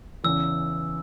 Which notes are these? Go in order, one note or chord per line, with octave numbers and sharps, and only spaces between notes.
E2 C#3 E3 E6